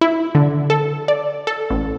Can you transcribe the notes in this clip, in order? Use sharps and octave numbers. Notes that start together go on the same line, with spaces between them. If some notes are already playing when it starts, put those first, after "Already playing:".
E4
D3
A4
D5
A4
A1